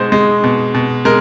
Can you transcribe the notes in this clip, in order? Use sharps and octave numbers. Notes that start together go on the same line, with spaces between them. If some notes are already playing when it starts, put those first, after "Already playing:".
Already playing: B2 G#3 C5
G#3
B2
B2
G#3 A#4